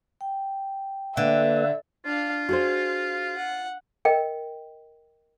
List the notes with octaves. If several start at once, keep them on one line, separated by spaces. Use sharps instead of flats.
G5
D3 A#3 A4 B4 E5
D4 F4 F5
F#4 G#4 C5 F5
F#5
A#4 D#5 G5